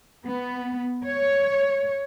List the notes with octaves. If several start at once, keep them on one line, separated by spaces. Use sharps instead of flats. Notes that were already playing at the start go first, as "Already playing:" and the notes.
B3
C#5